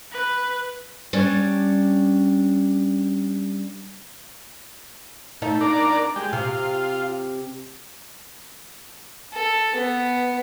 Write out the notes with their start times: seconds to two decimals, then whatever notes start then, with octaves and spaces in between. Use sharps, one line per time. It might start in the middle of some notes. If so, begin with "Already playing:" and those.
0.12 B4
1.13 G3 C#4 D4 C#5
5.42 A3 D#4
5.61 D4 A#4 D5
6.16 G#3 G4
6.33 C3 F4
9.33 A4
9.76 B3